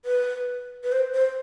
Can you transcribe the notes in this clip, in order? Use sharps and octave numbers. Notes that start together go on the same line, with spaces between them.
B4
B4
C5
C5